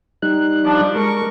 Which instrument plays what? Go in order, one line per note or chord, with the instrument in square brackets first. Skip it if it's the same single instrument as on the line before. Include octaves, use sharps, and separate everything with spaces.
[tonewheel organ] G3 D#4 F#6
[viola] F3 D4
[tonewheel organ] G#3 [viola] A#4 C#6